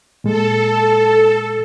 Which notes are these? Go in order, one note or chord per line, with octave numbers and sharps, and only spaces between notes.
A#2 G#3 A4